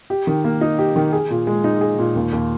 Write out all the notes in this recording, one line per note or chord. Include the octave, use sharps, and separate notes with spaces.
G4
D#3
A#3
D#4
G4
D#3
G#4
A#2
G#3
D#4
G#4
A#2
D#2
D#2